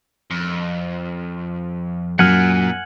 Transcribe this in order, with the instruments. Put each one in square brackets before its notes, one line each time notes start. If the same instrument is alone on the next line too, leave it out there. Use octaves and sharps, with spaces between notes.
[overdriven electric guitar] F2
[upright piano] F#2 [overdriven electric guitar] A#2 [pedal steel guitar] F#5 G#5 F6